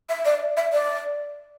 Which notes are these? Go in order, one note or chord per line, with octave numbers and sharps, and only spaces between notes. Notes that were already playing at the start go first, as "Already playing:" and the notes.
E5
D5
E5
D5